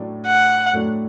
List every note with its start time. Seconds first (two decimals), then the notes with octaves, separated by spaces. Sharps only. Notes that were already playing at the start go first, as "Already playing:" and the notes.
Already playing: A2 F#3 A3 D4
0.26 F#5
0.73 A2 F#3 A3 D4